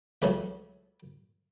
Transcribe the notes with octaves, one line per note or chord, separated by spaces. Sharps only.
C#2 F#3 A3 E5